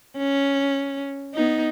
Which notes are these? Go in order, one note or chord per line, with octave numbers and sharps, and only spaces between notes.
C#4
B3 D#4